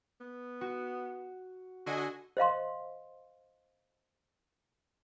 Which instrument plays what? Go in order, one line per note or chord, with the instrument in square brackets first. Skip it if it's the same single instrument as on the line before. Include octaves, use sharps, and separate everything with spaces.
[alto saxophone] B3
[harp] F#4
[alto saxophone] D3 [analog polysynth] F#4 D#5 G#5
[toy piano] C5 D#5 F5 C6